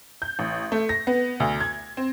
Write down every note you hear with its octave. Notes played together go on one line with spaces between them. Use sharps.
G6
A1
A3
A#6
B3
D2
G#6
C4